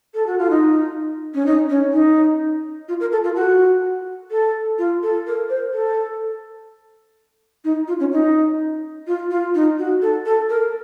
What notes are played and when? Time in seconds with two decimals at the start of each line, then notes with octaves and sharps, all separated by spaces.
0.14 A4
0.27 F#4
0.38 F4
0.50 D#4
1.34 C#4
1.46 D#4
1.69 C#4
1.93 D#4
2.88 F4
3.00 A#4
3.12 A4
3.24 F4
3.36 F#4
4.31 A4
4.78 F4
5.03 A4
5.27 A#4
5.49 C5
5.74 A4
7.64 D#4
7.88 F4
8.00 C#4
8.12 D#4
9.07 F4
9.31 F4
9.55 D#4
9.79 F#4
10.02 A4
10.26 A4
10.50 A#4